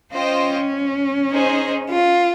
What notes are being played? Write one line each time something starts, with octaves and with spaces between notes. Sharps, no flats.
C#4 F4 C5 D#5 G5
D#4 G#4 C5 D#5
F4